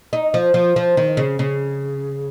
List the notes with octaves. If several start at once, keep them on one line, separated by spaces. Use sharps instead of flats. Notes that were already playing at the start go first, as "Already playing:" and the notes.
D#4
F3
F3
F3
D#3
C#3
C#3